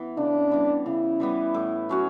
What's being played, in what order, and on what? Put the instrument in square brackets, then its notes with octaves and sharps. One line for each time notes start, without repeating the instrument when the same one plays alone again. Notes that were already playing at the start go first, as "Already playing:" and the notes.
Already playing: [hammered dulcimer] E3 B3
[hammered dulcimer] C#3 [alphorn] D4
[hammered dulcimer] E3 G3 B3
[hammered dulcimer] C#3 [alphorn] E4
[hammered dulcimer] E3 G3 B3
A2
F#3 C#4 F#4